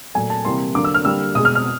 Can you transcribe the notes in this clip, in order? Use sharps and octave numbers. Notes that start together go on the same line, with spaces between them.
A#2 F#3 A3 G#5
A5
C3 E3 G3 A#3 C6
D3 F#3 A#3 D6
E6
F6
D3 G3 A#3 E6
B2 G#3 D#6
F6
F6